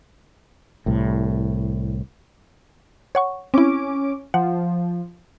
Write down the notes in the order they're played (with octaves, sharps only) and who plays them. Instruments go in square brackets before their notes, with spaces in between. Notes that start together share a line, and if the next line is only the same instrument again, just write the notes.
[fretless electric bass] C2 A2
[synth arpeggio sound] C#5 F#5 C#6
[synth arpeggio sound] C4 E4 [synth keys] C#4 D6 D7
[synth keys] F3 [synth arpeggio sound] F#5